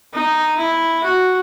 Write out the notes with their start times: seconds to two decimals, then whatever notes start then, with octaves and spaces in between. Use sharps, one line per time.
0.13 D#4
0.58 E4
1.04 F#4